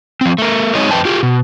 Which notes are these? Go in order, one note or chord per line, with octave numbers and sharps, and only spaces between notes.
F3 C4
A3 A#4
G#3 C4 D#4 G#4 C#5 D#5
F2 C#3 B4 D#5 G5 A5
F4 G4 G#4
B2